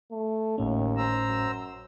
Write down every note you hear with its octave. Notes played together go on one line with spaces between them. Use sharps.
A3
G#1 D#2 A2 C#4
C5 A#5 E6
F#2